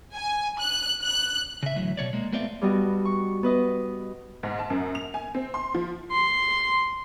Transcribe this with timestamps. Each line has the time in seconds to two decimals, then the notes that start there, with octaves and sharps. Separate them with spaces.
0.14 G#5
0.58 F#6
1.03 F#6
1.63 C#3 E5
1.76 A2 D3 E3 F#3
1.97 B2 F3 C#5 D5
2.13 G#3 A#3
2.32 A3 B3 C4 F4 D5 E5
2.61 G2 G3 B3 F#4 D#5
3.05 C#6
3.43 B3 B4 D#5
4.43 G#2
4.59 A5
4.70 F#2
4.95 F7
5.14 G#5
5.35 C4
5.54 C6
5.74 F3
6.12 C6